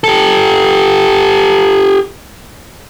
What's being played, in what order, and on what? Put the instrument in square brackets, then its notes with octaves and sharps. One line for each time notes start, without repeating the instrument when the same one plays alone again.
[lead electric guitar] G4 A4